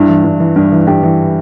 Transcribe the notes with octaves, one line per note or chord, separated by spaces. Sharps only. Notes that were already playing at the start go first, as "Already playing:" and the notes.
Already playing: G2 E4
E3
G2
E3
G2
E3
G2 G4
E3